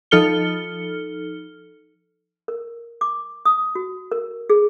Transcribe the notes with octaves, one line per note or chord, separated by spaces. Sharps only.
F3 D#4 A4 F6 C#7 G7
A#4
D6
D#6
F#4
A#4
G#4